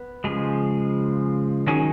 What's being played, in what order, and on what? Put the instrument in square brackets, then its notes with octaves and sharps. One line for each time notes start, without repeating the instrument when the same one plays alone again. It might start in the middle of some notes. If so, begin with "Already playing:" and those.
Already playing: [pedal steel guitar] B3
C#3 F3 G#3 G#4
D#3 F#3 C#4 G#4